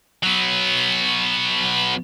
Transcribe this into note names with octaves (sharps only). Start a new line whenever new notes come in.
F#3 B3